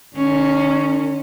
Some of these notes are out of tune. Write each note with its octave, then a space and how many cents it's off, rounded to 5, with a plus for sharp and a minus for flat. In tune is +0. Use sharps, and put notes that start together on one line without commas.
D#3 -45 C#4 +0